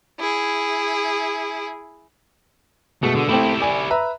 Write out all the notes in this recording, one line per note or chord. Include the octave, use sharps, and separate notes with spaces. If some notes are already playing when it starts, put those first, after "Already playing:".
E4 G#4
B2 G#3 A3
D3
A3 C4 E4 G4
D5 G#5
B4 E5 A#5